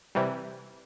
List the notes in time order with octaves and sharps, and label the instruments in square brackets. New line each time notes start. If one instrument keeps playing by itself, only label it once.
[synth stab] C3 E3 G3